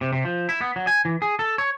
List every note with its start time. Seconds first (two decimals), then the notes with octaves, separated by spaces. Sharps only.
0.01 C3
0.13 C3
0.25 F3
0.49 E4
0.61 B3
0.76 F#3
0.87 G#5
1.05 E3
1.22 G#4
1.39 A4
1.58 C#5